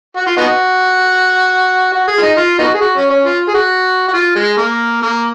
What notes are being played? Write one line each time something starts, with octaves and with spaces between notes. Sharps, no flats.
F#4
F4
B3 D#4 F#4
F#4
G#4
F4
D#4
F4
B3 D#4 F#4
G#4
F#4
C#4
C#4
F4
G#4
F#4
F#4
F4
G#3
A#3
A#3